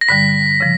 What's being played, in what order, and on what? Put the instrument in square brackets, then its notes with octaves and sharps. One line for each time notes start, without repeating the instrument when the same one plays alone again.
[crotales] A#6
[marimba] G2 D3 G3 [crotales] B6
[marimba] C#3 F3